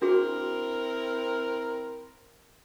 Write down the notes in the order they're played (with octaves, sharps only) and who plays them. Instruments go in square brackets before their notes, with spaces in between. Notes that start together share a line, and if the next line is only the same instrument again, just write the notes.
[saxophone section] C4 E4 A#4 [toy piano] D4 F#4 G#4